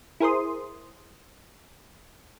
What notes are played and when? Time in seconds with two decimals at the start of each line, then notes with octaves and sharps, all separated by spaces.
0.20 E4 G#4 A#4 C5 C6 D#6